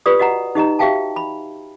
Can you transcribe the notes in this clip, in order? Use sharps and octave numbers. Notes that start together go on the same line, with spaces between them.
F4 G4 B4 D5 D#6
F#4 D#5 F#5 A#5
D#4 G4 D#5 A#5
F#4 G4 E5 F5 G5 A5
B5